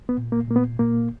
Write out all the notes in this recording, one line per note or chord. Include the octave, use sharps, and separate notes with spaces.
B3
A#2
A#3
A#2 A#3
B3
A#2 A#3